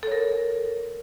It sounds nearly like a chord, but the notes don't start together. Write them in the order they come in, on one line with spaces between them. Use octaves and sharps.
A4 C#5 A#4